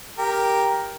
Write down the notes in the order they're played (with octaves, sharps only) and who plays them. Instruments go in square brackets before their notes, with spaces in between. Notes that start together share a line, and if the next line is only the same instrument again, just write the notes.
[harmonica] G4 A#4